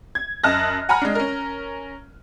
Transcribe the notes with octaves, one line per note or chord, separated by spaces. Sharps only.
G#6
F#2 D#5 A5 F6 F#6 A#6
F#5 G#5 A#5 B5 F6
G#3 D4
C#4 A#4